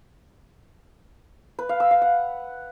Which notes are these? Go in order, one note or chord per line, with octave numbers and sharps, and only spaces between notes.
B4
F5
E6
F5
F#5